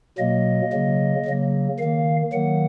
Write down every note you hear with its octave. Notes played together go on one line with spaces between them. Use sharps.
B2 F#3 A#3 D#5
C#3 F#3 A#3
C#3 F#3 A#3
D#3 A#3 F5
D#3 F#3 A#3 F#5